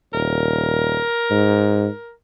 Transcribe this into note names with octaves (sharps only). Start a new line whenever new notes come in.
D#1 A#4
G#2